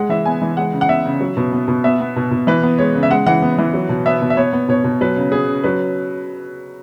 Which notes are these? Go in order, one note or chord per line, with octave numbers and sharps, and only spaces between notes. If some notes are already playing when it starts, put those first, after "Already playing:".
Already playing: G#3 F#5
E3 E5
B3 G#5
E3
G#3 F#5
C#3
F#5
B3 E5
C#3
F#3
B2
B3
B2
B3 E5
B3
B2
B2
E3 B4
B3
G#3 C#5
C#3
E5
G#3 F#5
E3 F#5
B3
E3
F#3
B2
B3 E5
B2
E5
B3 C#5
B3
B2 C#5
B2
F#3 B4
C#3
B3 G#4
C#3
F#3 B4